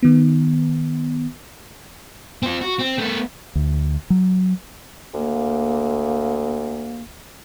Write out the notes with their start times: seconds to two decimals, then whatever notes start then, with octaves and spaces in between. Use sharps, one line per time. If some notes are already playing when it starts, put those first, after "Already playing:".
0.03 D#3 B3
2.43 C4 F4
2.61 F#4
2.79 C4
2.98 A3 B3
3.55 D2
4.10 F#3
5.14 D2 A#3